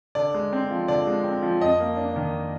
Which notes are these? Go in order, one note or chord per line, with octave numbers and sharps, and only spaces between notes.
D3 D5
G#3
C4
F3
D3 D5
G#3
C4
F3
F2 D#5
A#3
D4
D#3